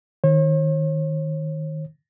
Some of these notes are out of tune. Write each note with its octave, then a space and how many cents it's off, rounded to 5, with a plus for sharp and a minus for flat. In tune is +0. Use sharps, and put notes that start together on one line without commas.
D#3 +0 C#5 -45